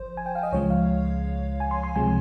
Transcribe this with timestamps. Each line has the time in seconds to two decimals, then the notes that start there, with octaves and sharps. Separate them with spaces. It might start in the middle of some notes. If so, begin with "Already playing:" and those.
Already playing: G1 F3 C5
0.17 G#5
0.26 G5
0.35 F5
0.43 D#5
0.52 C#2 C#3 F3 G#3 C#5
0.70 F5
1.60 G#5
1.71 C6
1.83 C6
1.95 C#2 C3 F3 G#3 G#5